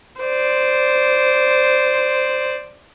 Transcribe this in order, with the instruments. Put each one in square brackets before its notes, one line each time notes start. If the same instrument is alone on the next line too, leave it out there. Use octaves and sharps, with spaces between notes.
[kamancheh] C5 D5